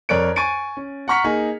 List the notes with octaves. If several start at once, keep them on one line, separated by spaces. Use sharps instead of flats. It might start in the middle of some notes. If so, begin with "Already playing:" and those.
F2 A#4 C#5 D5 F#6 D7
G#5 C#6 G#6 A6 D7 D#7
C#4
F#5 A#5 C#6 F6 B6 C#7
A#3 D#4 G#4